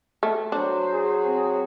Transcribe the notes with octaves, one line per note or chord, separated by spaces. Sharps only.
A3
F#3 D4 F#4 C5
G#4
C4